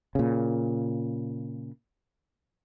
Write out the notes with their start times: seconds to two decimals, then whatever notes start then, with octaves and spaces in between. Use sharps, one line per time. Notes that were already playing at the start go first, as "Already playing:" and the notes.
0.15 A#2 C#3